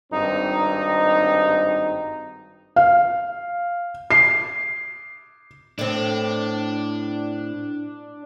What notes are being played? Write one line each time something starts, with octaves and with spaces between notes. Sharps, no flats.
G#1 G2 C4 D#4
F5
C7
A2 C4 D4